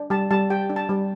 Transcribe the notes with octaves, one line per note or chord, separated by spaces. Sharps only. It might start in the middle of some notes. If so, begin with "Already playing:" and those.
Already playing: D4
G3 A5
G3 A5
G4 G5
D4
A5
G3